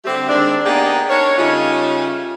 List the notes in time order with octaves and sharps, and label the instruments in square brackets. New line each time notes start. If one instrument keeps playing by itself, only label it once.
[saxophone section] D3 G3 A3 C4 G4
D#3 G#3 C4 D4
A#3 B3 D4 D#4 G4 G#4
D4 D#4 A#4 C#5
C#3 G3 A3 C#4 D#4 F4